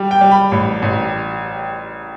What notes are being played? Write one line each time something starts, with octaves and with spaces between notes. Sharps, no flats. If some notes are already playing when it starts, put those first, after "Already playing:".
Already playing: G3
G5
G3
B5
A1
A1